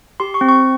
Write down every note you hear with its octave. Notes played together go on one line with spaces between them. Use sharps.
G4 C6
C#6
C4
C#6